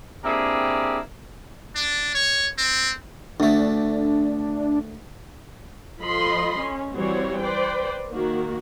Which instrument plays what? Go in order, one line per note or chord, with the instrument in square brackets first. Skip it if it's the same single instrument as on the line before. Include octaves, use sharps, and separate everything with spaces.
[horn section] A#3 C4 D4 E4 G4 G#4
[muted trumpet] D4
C#5
C4
[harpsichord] D2 A3 [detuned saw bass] D4
[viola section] F3 A4 D#5 B5 C6
C#4
E3 G3 C4 F#4 C5 C#5
B4 C5 D5 G5
D#3 A#3 F#4